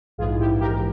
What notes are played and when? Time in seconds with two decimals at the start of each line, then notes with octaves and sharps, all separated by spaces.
0.18 A#1 G#2 E3 F4 G#4
0.39 E4 G4
0.61 G4 A#4